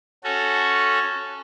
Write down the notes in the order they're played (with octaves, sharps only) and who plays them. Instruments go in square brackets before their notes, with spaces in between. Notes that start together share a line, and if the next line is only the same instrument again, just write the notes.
[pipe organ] C#4 F#4 A4